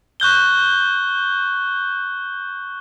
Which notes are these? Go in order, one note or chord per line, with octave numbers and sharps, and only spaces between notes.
C#6 F#6 G6 G7